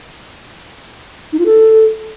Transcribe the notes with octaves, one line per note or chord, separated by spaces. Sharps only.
D#4
F4
A4